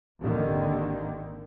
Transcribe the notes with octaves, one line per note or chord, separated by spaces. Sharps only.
G#1 D#2 D3 D#3